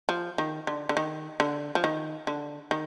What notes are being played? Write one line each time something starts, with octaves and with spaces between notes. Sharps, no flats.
F3
D#3
D3
D3
D#3
D3
F3
D#3
D3
D#3